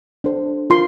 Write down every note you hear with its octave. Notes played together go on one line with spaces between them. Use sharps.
D4 A4 C5
F4 A#4 C6